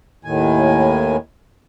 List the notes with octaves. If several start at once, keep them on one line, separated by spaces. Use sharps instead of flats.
D#2 A2 D#3 G#5